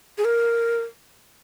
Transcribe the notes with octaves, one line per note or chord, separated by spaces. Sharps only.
G#4
A#4